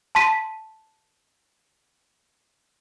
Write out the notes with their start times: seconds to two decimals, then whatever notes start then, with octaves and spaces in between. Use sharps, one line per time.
0.15 A5 C6 B6 D#7